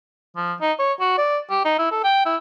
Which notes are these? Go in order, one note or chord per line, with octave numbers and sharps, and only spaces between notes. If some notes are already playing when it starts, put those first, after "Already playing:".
F3
D#4
C#5
F#4
D5
G4
D#4
E4
A4
G5
E4